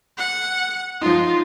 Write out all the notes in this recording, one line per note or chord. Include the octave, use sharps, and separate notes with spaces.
F#5
F3 D#4 F4